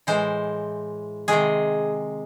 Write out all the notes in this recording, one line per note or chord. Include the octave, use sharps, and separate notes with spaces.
A2 E3 G#3 C5
C3 D#3 G#3 G#4